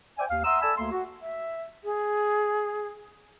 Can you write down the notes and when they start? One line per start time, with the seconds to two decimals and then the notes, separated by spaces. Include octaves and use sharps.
0.18 C5 D5 E5 G5 G#5
0.30 D#2 F5
0.44 E5 F#5 A#5 C6 D#6 E6
0.61 A4 D5 G#5 A5 B5 E6
0.77 D2 A3 A#3 A4 C6
0.91 F#4
1.22 E5
1.84 G#4